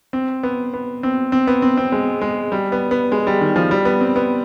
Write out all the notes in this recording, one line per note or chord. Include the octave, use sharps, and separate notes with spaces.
C4
B3
B3
C4
C4
B3
C4
C4
G#3
G#3
G3
B3
B3
G#3
G3
D#3
F3
G3
B3
C4
B3